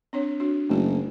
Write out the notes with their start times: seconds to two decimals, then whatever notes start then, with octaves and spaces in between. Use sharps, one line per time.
0.13 C4 D4 C#5
0.40 D4 F#4
0.69 F#1 A3 F#4